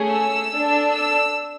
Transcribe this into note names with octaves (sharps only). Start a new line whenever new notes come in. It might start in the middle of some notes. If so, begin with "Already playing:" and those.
Already playing: A3 C#4 G#4
E6
D4 A4
E6